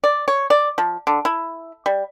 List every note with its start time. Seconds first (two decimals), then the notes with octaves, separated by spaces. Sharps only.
0.04 D5
0.28 C#5
0.50 D5
0.78 F3
1.07 D3
1.25 E4
1.86 G3